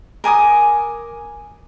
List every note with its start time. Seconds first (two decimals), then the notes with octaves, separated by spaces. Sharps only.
0.24 A#4 G#5 D6 D#6